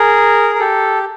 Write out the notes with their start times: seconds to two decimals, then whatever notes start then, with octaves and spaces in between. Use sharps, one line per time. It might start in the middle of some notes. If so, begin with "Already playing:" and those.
Already playing: G#4 A#4
0.55 A#4
0.59 G4 A4